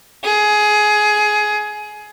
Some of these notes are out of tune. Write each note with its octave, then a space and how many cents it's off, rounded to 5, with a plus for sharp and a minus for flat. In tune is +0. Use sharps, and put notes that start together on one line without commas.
G#4 +15